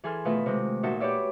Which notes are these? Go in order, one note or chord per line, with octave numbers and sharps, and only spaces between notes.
E3 G#4 A4 G#5 C6 F6
B2 D#3 A3 F4 B4 E5
C3 D#3 G#3
A#2 D#4 F#4 E5 A5
F#4 G4 B4 C#5 D5 E5